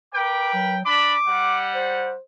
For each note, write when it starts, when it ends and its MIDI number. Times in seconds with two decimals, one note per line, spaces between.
0.14 0.77 70
0.14 0.77 71
0.14 0.77 79
0.14 0.49 86
0.54 0.85 54
0.85 1.15 62
0.85 1.15 83
0.85 1.63 86
1.27 2.12 55
1.27 2.12 78
1.75 2.19 72